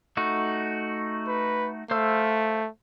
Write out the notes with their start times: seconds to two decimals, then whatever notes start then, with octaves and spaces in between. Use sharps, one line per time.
0.17 A3 D#4 F#4
1.28 B4
1.91 A3 C5 F5 E6